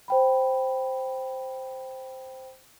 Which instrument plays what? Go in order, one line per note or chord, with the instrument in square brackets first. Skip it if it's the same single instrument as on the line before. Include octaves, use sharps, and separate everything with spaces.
[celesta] C5 G5 B5